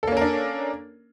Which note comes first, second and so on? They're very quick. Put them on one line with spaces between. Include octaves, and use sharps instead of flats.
A4 A#3 C#4 A#4 D4